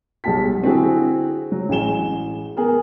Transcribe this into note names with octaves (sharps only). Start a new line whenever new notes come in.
B1 G3 G#3 A5 B6
D3 C4 E4 F#4 G#4
F#3
A1 G#3 G#5 E7 G7
B3 G#4 A#4